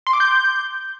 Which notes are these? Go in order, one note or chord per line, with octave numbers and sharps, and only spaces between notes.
C6
D6
G6